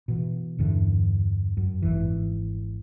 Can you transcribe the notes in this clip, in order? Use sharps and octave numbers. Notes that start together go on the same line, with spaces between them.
B2 E3
E2 G2 D3 E3
F#2
G#1 F2 E3